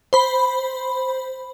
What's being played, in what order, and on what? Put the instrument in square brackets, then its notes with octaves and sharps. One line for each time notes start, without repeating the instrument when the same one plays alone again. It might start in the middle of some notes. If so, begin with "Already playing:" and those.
[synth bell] C5 B5